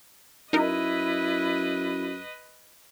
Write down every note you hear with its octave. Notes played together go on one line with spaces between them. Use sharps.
F#2 D#4 E4 A#4 B4 D#5